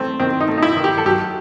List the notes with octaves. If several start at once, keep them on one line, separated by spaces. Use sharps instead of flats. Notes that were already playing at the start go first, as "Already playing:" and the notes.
Already playing: A3 C4
D#3 C4
D#4
A3
D#4
E4
D#3
G4
A4
F#3 G4